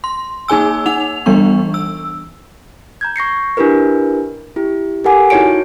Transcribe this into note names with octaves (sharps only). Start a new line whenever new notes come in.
C6
A#3 D#4 G#4 G#5 E6
D#4 F#5 F7
E3 G3 B3 D4 C#6
E6
A#5 G6 G#6
C#6 A#6 C7 C#7
D4 E4 G4 A#4 B4
E4 G4
G4 A4 A#4 F#5 G#5 D6
D#4 E4 F#4 C#5 C#7 D7